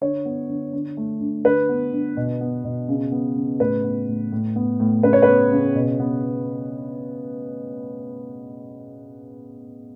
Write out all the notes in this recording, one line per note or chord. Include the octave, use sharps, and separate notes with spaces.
D3 C#5
B3
D3
D3
A3
D3
D3 B4
B3
D3
B2
B3
B2
C#3
B3
C#3
A2 B4
B3
A2
A2
B3
A2
C#3 B4
C#5
B3 B4
C#3
B2
B3